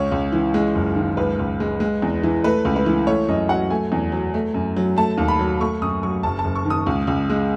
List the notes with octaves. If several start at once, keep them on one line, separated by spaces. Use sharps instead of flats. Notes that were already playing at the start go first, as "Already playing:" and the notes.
Already playing: C#2 C#5
C#2
E3
G#3
F#1
D#3
C#2 B4
C#2
G#3
G#3
E2
E3
A3 B4
C#2
B4
E3
A3 C#5
F#2 D#5
F#3 F#5
A3 G#5
E2
F#3
A3
F#2
F#3
A3 A5
D#2
B5
F#3
A3 C#6
F#2 D#6
F#3 C#6
F#1 A5
A5
F#1
C#6
D#3 D#6
C#2
C#2
G#3